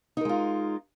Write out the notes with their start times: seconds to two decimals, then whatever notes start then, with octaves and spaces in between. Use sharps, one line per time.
0.17 D#4
0.21 A#4
0.25 G#3
0.29 F4